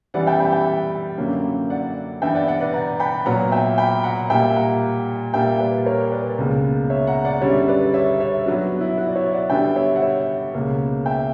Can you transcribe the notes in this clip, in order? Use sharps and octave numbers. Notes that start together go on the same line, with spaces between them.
F#2 E3 G3 B3 D5 F#5
E5 G5
G5 B5
E5 G5
F#2 D3 F#3 A#3
D5 F#5
G2 E3 B3 E5 G5
D5 F#5
D5 F#5
B4 D5
F#5 A#5
G5 B5
A#2 F#3 B3 F#5 A#5
E5 G5
G5 B5
F#5 A#5
A#2 G3 A#3 E5 G5
F#5 A#5
A#2 G3 A#3 E5 G5
B4 D5
A#4 C#5
B4 D5
C#2 B2 A#3
C#5 E5
F#5 A#5
D5 F#5
F#2 D3 G3 C#5 E5
B4 D5
C#5 E5
C#5 E5
G2 F#3 B3 F#4
E4
F#4
D5
C#5 E5
D5 F#5
G2 D3 G3 B3 E5 G5
C#5 E5
F#5
C#5 E5
C#2 B2 A#3
E5 G5